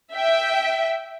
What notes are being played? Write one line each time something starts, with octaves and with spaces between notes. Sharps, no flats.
E5 G5